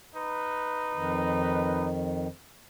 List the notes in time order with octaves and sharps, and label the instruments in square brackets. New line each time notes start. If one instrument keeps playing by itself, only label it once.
[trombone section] D#4 B4
[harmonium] F2 D#3